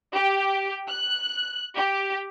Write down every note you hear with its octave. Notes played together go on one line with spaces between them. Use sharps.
G4
F#6
G4